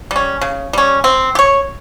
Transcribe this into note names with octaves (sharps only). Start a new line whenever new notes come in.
G3 C#4
C#3
G3 C#4
C4
G4
C#5